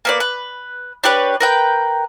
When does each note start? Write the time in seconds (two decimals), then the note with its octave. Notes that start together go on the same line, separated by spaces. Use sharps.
0.05 A#3 B3 D5
0.20 B4
1.04 D4 G4 B4 C#5
1.40 A#4 B4 G5